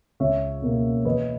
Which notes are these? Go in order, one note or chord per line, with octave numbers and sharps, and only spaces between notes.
C#2 C#5 E5
B2 A#3
E2 B4 D#5